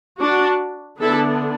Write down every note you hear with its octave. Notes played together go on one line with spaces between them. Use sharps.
D4 F#4
D3 B3 D4 E4 A4